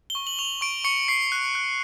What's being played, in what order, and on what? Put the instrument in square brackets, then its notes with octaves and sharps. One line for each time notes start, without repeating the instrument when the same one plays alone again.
[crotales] G7
C#6
F#7
C#6 F7
F#7
C#6 D7
C#6 C#7
C#6 C7
F#6
F#6